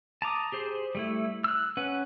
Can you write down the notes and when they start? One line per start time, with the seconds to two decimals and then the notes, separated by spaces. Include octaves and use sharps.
0.22 A5 A#5 D6 D#6
0.52 G4 G#4 C5
0.95 G3 A3 E4
1.44 E6 F#6
1.77 C#4 B4 F#5